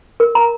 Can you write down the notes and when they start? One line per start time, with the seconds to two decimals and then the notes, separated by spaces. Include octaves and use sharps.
0.20 A#4
0.35 A#5